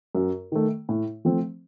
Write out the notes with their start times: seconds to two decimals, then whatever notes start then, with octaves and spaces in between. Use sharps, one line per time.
0.15 F#2
0.52 D#3 A3
0.89 A2
1.25 F3 A3 C4